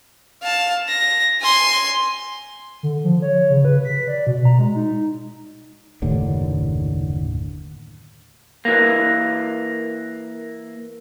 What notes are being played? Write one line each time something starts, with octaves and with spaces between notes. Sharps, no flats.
F5 A5
A#6
G#5 C6
D3
F3
C#5
C#3
B4
B6
D5
B2
A#5
G#3
D#4
F#1 D#2 A2 D3
E3 A#3